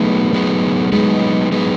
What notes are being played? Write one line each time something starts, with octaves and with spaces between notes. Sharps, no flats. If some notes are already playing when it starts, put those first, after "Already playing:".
Already playing: F#3 A3 B3 D#4 G#4 B4
F#3 B3 D#4 G#4 B4
F#3 G#3 B3 D#4 G#4 B4
F#3 B3 D#4 G#4 B4